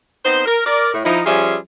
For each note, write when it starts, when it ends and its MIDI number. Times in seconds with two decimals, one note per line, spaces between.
0.25 0.44 59
0.25 0.44 60
0.25 0.44 63
0.25 0.44 72
0.46 0.64 70
0.66 0.92 70
0.66 0.92 74
0.93 1.03 45
1.05 1.20 53
1.05 1.20 63
1.05 1.20 64
1.26 1.56 53
1.26 1.56 55
1.26 1.56 61
1.26 1.56 65
1.26 1.56 68
1.26 1.56 76